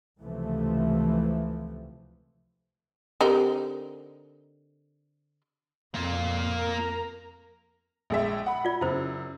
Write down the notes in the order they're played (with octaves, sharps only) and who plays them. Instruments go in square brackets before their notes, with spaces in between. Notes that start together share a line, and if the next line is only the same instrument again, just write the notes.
[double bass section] C#2 C3 E3 F3 A3
[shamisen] D3 C4 D#4 [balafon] G4 A#4
[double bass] F2 [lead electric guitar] A#3 F4
[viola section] A#4 A#5
[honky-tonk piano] A#1 G#3 E5
F#5 B5
[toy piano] F4 D5
[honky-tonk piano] F#2 C#3 [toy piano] E4 C5